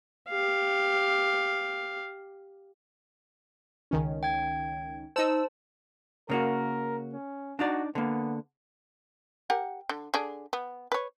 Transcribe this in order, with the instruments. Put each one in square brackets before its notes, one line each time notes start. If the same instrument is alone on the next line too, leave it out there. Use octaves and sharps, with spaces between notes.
[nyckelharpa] G4 F5
[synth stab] C#2 D#3 C#4
[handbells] G5 G#6
[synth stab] D#4 E6 [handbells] C5 A5
[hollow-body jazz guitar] C#3 A#3 F#4 [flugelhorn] A#4
[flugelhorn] C#4
[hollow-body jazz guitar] D4 D#4 D5 [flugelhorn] F#4
[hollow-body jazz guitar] D3 A#3 [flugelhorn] B3
[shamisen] G4 A#4 F#5
D3
D3 G#4 D5
B3
B4 C#5